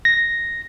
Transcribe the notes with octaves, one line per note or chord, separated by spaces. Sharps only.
A#6